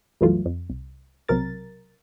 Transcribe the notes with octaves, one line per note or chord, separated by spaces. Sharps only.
C2 F#2 E3 F#3 A3 F4
F2
C2
B1 C3 F#3 A#4 A6